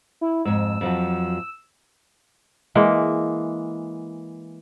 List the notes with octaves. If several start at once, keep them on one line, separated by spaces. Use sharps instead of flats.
E4
F2 G#2 E6
F2 F3 F#3
E3 G#3 A#3